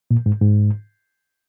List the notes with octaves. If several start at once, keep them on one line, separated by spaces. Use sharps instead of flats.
A#2
G#2
G#2